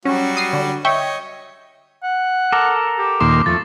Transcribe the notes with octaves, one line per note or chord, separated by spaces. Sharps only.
F#3 G3 C#4 F#4
D#6 C7
D3
C#5 D#5 E5 G5 C#6
F#5
A4 A#4 D6
G4
D#2 A#2 C6 D6
F2 A3 A6